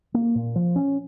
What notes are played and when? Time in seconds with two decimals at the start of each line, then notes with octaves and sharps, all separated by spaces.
0.14 A#3
0.35 A#2
0.56 F3
0.76 C#4